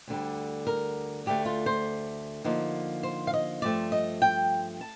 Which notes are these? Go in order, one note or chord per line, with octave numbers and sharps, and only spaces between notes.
D2 D3 G3
A#4
D2 D3 A3 G4
F4
C5
D3 F3 A#3 D#4
C5
F5
D#5
G2 F3 A3 C4 D5
D#5
G5
A5